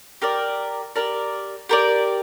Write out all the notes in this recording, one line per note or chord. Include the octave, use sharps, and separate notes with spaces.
G4 A#4 D5
G4 A#4 D5
G4 A#4 D5